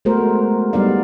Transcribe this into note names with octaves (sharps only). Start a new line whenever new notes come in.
G#3 A3 B3 F#4 A#4 C5
G3 B3 D#4 D5 F5